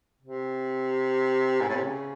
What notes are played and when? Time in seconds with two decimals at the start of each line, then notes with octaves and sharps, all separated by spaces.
0.21 C3
1.61 G#2
1.69 A2
1.76 C3
1.84 C#3